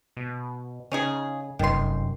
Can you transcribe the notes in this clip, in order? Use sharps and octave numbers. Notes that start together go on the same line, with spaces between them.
B2
C#3 C#4 D#4 G#4
F1 F#2 C3 D#3 F#3 C6